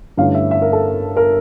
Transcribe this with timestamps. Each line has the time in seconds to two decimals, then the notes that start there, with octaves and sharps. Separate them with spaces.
0.17 G2 D3 A3 C#4 E4 F5
0.34 E5
0.51 E5
0.62 A#4
0.73 A4
1.17 A#4